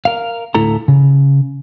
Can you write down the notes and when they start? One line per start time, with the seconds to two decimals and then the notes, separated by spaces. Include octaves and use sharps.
0.05 A#4 F5
0.55 D2 A2 E4 A4 A#5
0.88 C#3